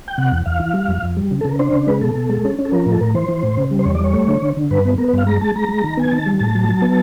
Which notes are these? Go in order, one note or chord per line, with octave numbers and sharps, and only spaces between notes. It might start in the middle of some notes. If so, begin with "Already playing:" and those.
G5
C3 F#5
E2
E2 F5
E3
G3
F2
F2
G3
C#3
A4
C#3 A#4
D4 C5
C#3
G#3 B4
B2 A4
B2
G#3
C#4
C#4
A4
F3 A#4
A2
A4
A2 A#4
E3 C5
E3
A2
C#3
G3
C5
E2 C#5
D5
G3 C#5
A3
D3
D3
D3
G2 B4
B3
B3 A#4
B4
G2 F5
G#3 A#5
G#3 A5
G#3 A#5
G#3
D#3
B3 G#5
D#3 A5
G3
A2 A5
F#3
F#3
B3